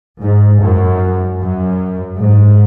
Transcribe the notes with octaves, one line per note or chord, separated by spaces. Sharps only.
G#2
F#2
F#2
G#2